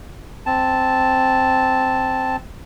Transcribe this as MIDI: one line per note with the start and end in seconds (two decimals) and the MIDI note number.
0.46 2.36 60
0.46 2.36 81